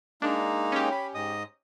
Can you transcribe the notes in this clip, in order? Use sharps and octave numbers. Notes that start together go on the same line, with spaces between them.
G#3 A#3 D4 D#4
C#4 G4
B5
G#2 D#5 D#6